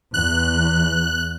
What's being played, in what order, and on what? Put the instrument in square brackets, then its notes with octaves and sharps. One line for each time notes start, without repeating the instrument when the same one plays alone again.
[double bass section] E2 [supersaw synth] F#6